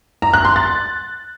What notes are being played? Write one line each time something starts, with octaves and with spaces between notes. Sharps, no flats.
A#5
F#6
C6
A6